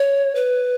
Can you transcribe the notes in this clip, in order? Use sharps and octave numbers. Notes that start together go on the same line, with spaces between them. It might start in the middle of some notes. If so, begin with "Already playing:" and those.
Already playing: C#5
B4